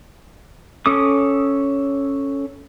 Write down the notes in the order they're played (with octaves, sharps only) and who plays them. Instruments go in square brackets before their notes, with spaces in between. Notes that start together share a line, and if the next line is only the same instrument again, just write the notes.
[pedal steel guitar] C#4 A4 D6 D#6